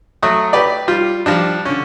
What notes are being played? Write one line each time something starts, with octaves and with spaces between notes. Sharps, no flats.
F#3 A3 F#4 C#6 D#6
G4 B4 D5
G3 F4
F3 G3 D4
D3 C#4